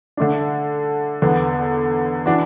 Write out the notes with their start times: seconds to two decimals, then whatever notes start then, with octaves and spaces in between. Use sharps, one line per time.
0.17 D3 A3 D4
1.22 E2 D3 B3
2.26 E3 D4 F#4